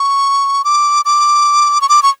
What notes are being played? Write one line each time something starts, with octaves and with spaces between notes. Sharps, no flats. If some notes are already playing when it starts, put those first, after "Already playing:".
Already playing: C#6
D6
D6
C#6
D6
C#6